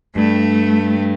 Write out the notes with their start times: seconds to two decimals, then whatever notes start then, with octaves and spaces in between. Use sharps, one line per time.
0.16 G2 A3